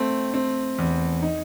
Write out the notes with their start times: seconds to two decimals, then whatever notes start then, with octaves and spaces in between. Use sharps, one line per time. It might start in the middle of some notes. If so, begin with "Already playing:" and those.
Already playing: A3 C4
0.34 C4
0.78 E2
1.22 D#4